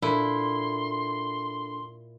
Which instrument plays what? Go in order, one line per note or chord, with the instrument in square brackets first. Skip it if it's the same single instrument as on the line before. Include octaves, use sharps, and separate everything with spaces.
[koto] A#2 E4 [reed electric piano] D4 A4 B5 [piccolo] C6